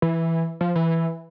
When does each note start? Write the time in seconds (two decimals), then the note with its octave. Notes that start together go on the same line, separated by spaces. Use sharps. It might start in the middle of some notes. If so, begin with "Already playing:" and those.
0.02 E3
0.61 F3
0.75 E3